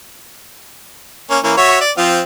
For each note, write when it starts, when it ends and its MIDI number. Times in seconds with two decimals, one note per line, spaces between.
1.30 1.38 58
1.30 1.38 61
1.44 1.52 52
1.44 1.52 58
1.44 1.52 61
1.57 1.79 66
1.57 1.79 73
1.57 1.79 76
1.81 1.91 74
1.98 2.21 53
1.98 2.21 60
1.98 2.21 65